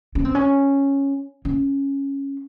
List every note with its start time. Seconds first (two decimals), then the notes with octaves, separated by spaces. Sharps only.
0.15 C#4
0.25 C4
0.35 C#4
1.45 C#4